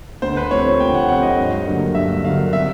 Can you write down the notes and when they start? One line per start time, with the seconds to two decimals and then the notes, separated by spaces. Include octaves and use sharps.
0.22 D2 C5
0.37 B4
0.51 C3 F3 A3 C4 C#5
0.80 D2 G5
0.94 F#5
1.08 C3 F3 A3 C4 F#5
1.23 D#5
1.38 G2
1.66 D3 F#3 A#3
1.95 G2 E5
2.24 D3 F#3 A#3 F5
2.53 C3 E5